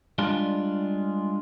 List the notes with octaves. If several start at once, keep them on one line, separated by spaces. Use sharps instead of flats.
G3 G#3 D4 F4